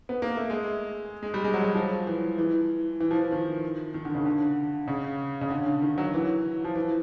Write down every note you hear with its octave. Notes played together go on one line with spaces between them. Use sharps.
B3
A#3
A3
G#3
G#3
G3
G#3
F#3
F#3
F3
E3
E3
E3
F3
E3
D#3
D#3
D3
C#3
D3
C#3
C#3
D3
D3
D#3
F#3
E3
F3
E3